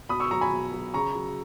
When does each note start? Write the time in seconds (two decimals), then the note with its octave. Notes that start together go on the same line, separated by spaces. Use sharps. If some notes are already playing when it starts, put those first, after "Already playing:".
0.09 B2 B5 D#6
0.20 C#6 E6
0.31 F#3 A#5 C#6
0.41 G#5 B5
0.51 B2
0.72 F#3
0.94 C#3 A#5 C#6
1.15 F#3